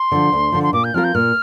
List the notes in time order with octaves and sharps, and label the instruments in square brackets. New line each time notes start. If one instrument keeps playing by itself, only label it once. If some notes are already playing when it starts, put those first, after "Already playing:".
Already playing: [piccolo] C6
[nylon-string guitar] D3 F3
D2
D3 F3
[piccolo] C6
[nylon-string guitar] A#2 [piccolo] D6
[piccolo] G6
[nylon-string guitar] F3 C4 F4 A#4 [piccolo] F6
[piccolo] G6
[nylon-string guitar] A#2 [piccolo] F6